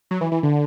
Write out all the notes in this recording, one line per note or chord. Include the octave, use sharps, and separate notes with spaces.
F#3
E3
E3
D3